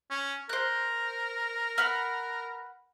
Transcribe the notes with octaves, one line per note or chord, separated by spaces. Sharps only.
C#4
A#4 C5 F#6
B4 F#5 F6